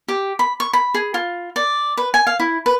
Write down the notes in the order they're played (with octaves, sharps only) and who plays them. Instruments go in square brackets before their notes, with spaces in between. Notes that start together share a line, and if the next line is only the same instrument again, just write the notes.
[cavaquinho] G4
B5
C#6
B5
G#4
F4
D5
B4
G#5
F5
E4
B4